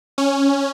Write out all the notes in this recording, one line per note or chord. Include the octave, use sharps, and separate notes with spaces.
C#4